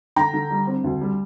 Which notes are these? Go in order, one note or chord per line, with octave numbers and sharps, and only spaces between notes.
D3 G5 A#5
D3
G3
C4
D2
G3